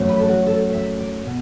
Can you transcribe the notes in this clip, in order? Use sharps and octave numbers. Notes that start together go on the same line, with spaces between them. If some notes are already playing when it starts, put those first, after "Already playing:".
Already playing: F#2 F#3 A3
B4
A4
F#4
A4
E5
D5
B2